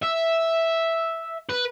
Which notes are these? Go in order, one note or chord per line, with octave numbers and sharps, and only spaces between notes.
E5
B4